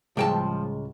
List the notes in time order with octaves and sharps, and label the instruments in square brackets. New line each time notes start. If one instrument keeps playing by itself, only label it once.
[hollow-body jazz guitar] C#2 G5 A5 [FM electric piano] A2 G3 G#3 [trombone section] F3